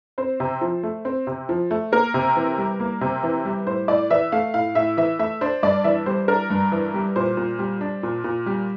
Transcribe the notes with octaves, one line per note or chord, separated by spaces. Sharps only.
C4 C5
C3
F3
A3
C4
C3
F3
A3
A#3 A#4
C3
E3
G3
A#3
C3
E3
G3
A2 C5
A2 D5
E3 E5
A3 F5
A2 F5
A2 E5
E3 E5
A3 E5
D4 C5
G2 D5
E3 E5
G3 C5
D4 A#4
G2
E3
G3
A#2 C5
A#2
G3
D4
A#2
A#2
G3